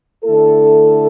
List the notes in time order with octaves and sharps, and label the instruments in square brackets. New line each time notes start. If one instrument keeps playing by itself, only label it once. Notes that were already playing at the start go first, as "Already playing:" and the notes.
[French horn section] D3 A3 E4 A4